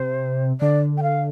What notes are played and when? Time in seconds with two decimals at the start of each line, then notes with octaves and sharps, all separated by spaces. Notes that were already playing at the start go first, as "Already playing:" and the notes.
Already playing: C3 C5
0.61 D3 D5
0.98 G5
1.03 F5